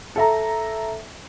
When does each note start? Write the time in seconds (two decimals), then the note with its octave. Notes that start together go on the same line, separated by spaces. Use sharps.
0.16 A4 E5 A#5